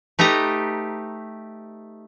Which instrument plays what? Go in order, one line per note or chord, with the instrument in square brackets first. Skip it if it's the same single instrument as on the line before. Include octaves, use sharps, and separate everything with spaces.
[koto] A3 D#4 G4 B4 A#5